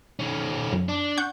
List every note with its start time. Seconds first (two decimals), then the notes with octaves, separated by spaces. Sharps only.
0.19 D#3 C#4
0.72 F#2
0.88 D4
1.18 F#5 C#6 G6